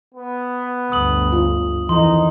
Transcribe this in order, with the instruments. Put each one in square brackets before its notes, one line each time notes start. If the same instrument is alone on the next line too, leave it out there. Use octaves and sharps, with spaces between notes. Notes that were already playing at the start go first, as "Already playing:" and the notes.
[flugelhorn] B3
[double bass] G1 D2 [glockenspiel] D#6 F#7
[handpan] F4
[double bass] F2 D#3 [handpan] E3 [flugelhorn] D#4 [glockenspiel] C6